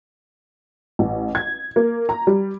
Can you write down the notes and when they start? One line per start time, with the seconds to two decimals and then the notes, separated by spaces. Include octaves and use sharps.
0.99 A1
1.35 G#6
1.76 A#3
2.09 A#5
2.27 G3